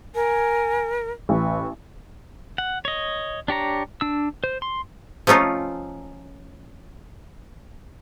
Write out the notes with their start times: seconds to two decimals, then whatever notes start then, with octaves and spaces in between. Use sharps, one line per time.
0.15 A#4 G#5
1.29 A1 B4 C#6
2.58 F#5
2.85 C#5 D#5
3.48 D4 G4 C#5 A#5
4.01 D4 E6
4.44 C5
4.62 C6
5.27 F3 A3 C#4 D#4 F4